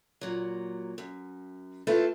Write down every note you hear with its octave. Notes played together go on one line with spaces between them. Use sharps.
A#2 F#3
F#2
A3 C4 E4 F4 A4 B4